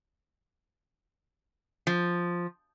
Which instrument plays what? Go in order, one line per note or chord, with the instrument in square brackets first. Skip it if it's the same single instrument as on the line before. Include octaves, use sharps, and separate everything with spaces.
[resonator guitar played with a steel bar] F3